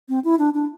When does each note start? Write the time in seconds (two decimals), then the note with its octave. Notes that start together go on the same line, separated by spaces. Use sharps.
0.09 C4
0.25 E4
0.39 D4
0.54 D4